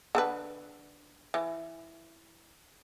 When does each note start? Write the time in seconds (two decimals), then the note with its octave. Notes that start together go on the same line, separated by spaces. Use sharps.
0.15 D3 A4 B4
1.34 E3